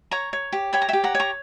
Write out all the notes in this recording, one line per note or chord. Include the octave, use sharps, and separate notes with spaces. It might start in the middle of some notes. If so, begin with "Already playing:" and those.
C#5 A#5 C#6
C#5
G4
C#5 G5 B5
A#5
G4 E5 G5
F#5 A#5
C#5
A#5 C#6